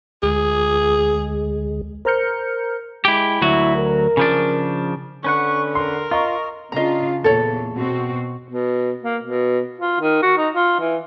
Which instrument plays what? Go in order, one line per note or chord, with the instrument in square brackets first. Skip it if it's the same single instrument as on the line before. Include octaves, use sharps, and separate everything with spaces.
[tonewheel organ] D2 G#3 [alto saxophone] G#4
[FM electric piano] A#4 C5 A#5 F6 G6 C#7
[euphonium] G#3 [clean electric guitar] E4 G4
[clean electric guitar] D2 F#3 F#4 [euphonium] E4
[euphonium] A#4
[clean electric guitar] C#3 F3 D4
[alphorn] D3 [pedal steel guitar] C#4 B4 F#5 [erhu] C#6
[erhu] A#4 [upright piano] C6
[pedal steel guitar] F4 [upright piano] D#5 A#5 C#6
[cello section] C#3 D4 F4 [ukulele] D#5 A#5
[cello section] E2 A#2 [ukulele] A4 C#5
[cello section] B2 C4 F#4
[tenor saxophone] B2
A#3
B2
F4
D#3
F#4
D#4
F4
E3